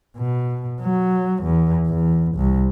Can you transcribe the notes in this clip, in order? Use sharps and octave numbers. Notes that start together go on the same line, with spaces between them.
B2
F#3
E2
E2
C2